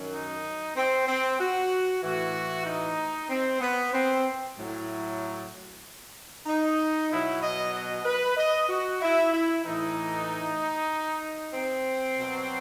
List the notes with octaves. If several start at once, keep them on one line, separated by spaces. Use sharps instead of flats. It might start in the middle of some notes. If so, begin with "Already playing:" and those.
Already playing: F#2 D#3 F#3
D#4
C4
C4
F#4
A2 E3 F#4
D#4
C4
B3
C4
A2 F#3
D#4
B2 F#3 E4
D#5
D#5
B4
D#5
F#4
E4
E4
A2 E3 D#4
C4
B2 F#3